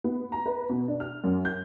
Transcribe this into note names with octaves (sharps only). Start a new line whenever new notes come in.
B3
A#5
B4
B2
D4
F6
F#2
G6